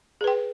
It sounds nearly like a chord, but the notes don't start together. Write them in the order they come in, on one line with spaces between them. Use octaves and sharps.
G#4 B4 G5